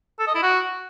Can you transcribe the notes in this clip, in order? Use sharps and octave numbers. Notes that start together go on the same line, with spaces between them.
A4
D#5
E4
F#4